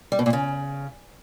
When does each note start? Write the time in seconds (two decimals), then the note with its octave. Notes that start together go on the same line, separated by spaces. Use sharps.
0.12 G3
0.19 B2
0.26 A#2
0.33 C#3